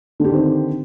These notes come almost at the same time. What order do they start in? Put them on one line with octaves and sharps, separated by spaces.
D3 G4 D#3 C4